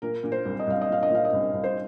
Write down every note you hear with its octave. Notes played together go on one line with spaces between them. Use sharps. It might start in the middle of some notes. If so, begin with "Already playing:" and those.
A#2 A#4
A#2
C5
C2
D#5
C2 F5
D#5
A#2 F5
D#5
A#2 F5
D#5
C2
C2
C5